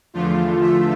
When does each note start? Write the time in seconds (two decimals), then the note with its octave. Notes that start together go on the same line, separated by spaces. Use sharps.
0.14 E2 D3 F3 A3 F4
0.61 E5